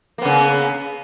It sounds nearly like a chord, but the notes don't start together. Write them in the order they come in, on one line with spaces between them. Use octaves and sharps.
A#3 B3 C#3